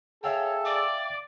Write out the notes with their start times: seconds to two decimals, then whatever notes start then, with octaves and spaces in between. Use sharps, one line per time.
0.24 G#4 A4 C#5 E5 F5 G5
0.66 D5 D6